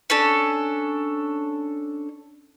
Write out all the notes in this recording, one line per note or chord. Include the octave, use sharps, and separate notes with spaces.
C#4 D4 A4